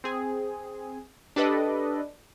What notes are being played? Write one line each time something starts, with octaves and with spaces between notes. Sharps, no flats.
C4 G#4
D4 G4 A4 B4 D5 D#5